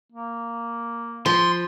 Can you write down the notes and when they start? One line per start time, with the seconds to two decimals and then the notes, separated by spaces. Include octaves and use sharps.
0.12 A#3
1.26 F3 C6